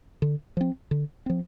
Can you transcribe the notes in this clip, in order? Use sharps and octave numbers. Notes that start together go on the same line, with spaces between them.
D3
F3 C4
D3
F3 C4